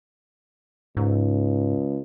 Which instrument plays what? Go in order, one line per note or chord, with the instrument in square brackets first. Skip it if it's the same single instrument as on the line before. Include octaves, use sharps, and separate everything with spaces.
[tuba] C#2 [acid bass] G#2